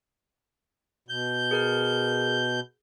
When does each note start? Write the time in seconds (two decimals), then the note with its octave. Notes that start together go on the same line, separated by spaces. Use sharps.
1.09 B2 G6
1.51 G#4 A#4 F6